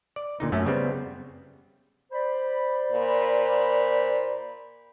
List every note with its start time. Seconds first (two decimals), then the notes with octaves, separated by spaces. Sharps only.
0.16 D5
0.40 A#2 D3 D#4
0.52 F#2 A3 C#4
0.65 C#3 G3 B3 C4
2.12 C5 D5 B5
2.92 A#2